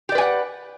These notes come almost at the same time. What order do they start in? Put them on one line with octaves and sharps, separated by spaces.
G4 D5 B4 G#5 F#5